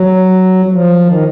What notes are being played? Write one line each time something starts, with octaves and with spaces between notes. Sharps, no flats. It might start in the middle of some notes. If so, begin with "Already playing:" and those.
Already playing: F#3
F#3
F3
D#3